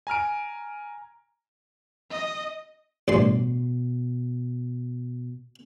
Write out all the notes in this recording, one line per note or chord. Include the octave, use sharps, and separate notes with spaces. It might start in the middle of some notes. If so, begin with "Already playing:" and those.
G#5 A#5 F6 D7
D#5
A1 G2 B2 C6